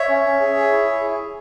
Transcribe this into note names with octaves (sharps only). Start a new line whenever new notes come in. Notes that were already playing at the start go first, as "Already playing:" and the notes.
Already playing: C#5 E5
C#4
C#4
G#4
G#4
E4
G#4